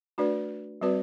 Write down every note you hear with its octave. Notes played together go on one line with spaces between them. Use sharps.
A3 D4 F#4 B4 D5
G3 C4 F#4 B4 D5